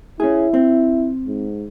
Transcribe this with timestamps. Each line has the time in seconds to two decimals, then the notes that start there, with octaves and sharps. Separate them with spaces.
0.20 C#4 E4 G#4
0.54 C4
1.27 G#2